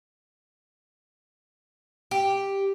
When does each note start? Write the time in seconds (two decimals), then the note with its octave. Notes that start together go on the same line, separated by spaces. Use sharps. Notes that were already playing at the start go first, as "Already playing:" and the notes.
2.11 G4